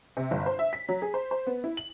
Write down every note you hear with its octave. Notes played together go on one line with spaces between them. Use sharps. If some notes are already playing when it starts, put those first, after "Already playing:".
C3
G1
C5
E5
B6
F#3
G#4
C5
C5
B3
E4
F#7